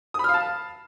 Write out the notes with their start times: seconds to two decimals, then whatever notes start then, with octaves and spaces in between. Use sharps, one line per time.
0.14 D#6
0.19 B5
0.24 F6
0.29 F5
0.34 A5